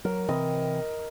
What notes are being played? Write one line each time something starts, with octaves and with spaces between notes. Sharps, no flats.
F#3 A#4
C3 E3 C4 D#5